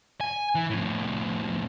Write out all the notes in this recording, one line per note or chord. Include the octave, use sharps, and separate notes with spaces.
G#5
E3
F2 A2